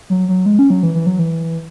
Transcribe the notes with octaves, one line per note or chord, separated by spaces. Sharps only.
F#3
F#3
G#3
C#4
F#3
E3
E3
F#3
E3